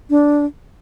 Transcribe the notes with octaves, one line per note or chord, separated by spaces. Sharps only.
D4